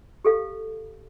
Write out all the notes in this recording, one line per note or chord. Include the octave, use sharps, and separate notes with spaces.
G4 A4 F5